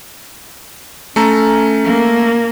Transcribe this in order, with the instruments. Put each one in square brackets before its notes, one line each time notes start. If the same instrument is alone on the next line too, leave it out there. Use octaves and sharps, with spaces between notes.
[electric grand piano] A3 A4 A#5 [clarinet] C#4
[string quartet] A#3